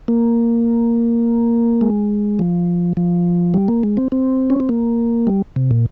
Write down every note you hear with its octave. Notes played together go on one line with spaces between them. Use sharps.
A#3
G#3
F3
F3
G3
A#3
G#3
C4
C4
C#4
C4
A#3
G3
C3
A#2